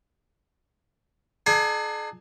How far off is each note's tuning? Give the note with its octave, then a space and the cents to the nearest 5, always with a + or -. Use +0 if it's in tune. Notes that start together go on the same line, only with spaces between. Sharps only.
D4 +45 G#4 +45 G#5 +0